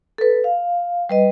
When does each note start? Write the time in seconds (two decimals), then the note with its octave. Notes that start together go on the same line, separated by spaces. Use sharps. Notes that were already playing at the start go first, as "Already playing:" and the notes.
0.18 A4 B4
0.44 F5
1.09 G3 B4 D#5